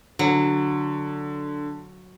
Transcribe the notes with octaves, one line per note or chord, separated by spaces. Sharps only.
D3 F#3